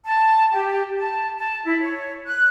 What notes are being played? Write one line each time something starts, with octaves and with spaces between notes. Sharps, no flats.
A5
G4
A5
A5
E4
C#5
F#6